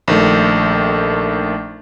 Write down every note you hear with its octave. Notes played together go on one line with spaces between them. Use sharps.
A#1 D#3 A3